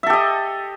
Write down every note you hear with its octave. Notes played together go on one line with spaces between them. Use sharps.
G4 A4 D#5 E5